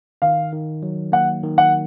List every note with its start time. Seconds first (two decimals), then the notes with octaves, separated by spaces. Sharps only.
0.22 D#3 F5
0.53 D#3
0.83 F#3
1.12 A#3 F#5
1.43 D#3
1.58 F#5